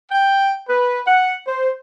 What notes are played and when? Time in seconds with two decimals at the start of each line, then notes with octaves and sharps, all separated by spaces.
0.12 G5
0.69 B4
1.07 F#5
1.46 C5